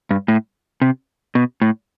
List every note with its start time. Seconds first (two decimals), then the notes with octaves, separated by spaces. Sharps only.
0.11 G2
0.28 A2
0.82 C3
1.35 B2
1.62 A2